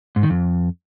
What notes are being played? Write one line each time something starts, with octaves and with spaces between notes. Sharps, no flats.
G#2
D#3
F2